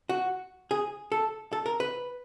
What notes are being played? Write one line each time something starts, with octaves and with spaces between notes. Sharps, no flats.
F#4
G#4
A4
A4
A#4
B4